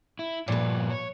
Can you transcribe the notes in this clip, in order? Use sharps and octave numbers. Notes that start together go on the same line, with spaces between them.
E4
G2 A#2 F3 B4 D5
C#5